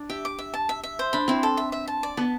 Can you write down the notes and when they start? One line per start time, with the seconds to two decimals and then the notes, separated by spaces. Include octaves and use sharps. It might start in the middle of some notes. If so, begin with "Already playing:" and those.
Already playing: D4
0.09 G4 E5
0.25 D6
0.39 E5
0.54 A5
0.69 E5
0.83 E5
0.99 C5
1.13 D4 B5
1.28 C4 E4
1.43 A4
1.57 E5
1.72 E5
1.88 A5
2.03 D5
2.17 B3 A5